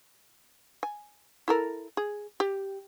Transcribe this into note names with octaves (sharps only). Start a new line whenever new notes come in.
G#5
E4 A4 A#4
G#4
G4